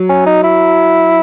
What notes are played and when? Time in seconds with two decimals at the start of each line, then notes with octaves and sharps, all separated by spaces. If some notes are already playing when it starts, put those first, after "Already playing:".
Already playing: F#3
0.09 C#4
0.26 D#4
0.43 E4